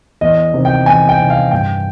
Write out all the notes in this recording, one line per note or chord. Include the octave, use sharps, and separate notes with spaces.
E2 D#5
C3 D#3
G5
E2 G#5
G5
C3 D#3
F5
G2 G5